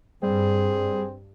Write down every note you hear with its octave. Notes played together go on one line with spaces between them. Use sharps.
G2 G3 C4 G#4